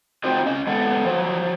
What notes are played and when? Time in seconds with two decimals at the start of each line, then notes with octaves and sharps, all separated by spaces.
0.24 C4 D#4 F4 F#4 C5 D#5
0.46 C#4 D#5
0.67 G#3 B3 A4 F#5
1.05 F3 F#3